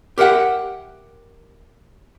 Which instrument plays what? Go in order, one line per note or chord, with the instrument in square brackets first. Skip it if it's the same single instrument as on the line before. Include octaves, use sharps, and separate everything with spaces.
[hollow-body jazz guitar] G4 A#4 E5 F#5 G5